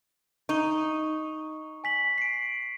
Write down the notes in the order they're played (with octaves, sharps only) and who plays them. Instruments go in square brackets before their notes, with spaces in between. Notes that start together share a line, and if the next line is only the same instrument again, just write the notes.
[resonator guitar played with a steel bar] D#4 [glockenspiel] C#6
[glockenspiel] G#5 B6 F#7
C7 D7